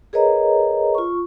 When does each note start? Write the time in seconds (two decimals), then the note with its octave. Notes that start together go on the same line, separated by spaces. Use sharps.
0.13 G#4 A#4 B4 C#5 D#5 A#5
0.95 F4 C#6